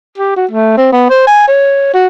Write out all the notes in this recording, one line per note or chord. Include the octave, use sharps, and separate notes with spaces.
G4
F#4
A3
C4
B3
C5
G#5
C#5
F#4